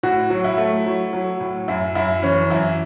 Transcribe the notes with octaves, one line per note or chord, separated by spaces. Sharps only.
A2 F#4
F#3
E4
A3
F#3
F#3
A2
F#2 E4
F#2 E4
E3 C#4
F#2 E4